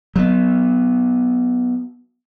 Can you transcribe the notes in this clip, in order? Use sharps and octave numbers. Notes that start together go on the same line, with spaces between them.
F#3 B3